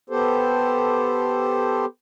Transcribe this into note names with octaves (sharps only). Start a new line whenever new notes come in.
B3 G4 A4 C5